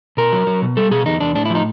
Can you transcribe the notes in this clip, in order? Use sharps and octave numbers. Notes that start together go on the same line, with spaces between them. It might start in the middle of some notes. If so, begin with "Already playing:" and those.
B2 A#4
F#3
F#3
B2
G3 A4
B2 G#4
E2 D#4
E2 D4
A2 D4
E4
F3
D#4